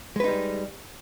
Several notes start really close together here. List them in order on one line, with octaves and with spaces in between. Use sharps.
G#3 B4 D#4 G3